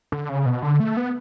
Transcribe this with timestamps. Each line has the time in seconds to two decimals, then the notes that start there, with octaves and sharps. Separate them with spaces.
0.12 D3
0.29 C#3
0.46 B2
0.63 D3
0.80 A3
0.97 B3